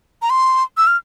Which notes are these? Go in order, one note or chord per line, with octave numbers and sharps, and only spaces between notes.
A#5
C6
E6
F6